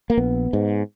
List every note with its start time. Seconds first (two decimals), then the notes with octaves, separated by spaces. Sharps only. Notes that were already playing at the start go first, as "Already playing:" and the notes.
0.10 A#3
0.17 A#1 B3
0.53 G#2